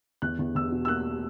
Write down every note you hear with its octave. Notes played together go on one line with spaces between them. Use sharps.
E2 F#6
E2
E2 E6
B2
E6
A#3 F#6